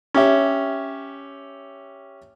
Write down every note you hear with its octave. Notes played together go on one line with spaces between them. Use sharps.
C#4 G4 E5